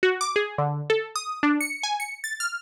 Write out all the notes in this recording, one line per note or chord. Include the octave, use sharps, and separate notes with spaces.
F#4
D6
G#4
D3
A4
D#6
D4
C#7
G#5
C#7
A6
F6